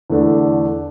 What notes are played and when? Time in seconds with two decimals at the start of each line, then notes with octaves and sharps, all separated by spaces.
0.10 E2 D3 A3 D4